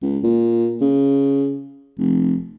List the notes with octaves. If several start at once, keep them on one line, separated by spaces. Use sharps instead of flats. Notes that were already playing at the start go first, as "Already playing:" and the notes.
C#2
A#2
C#3
F1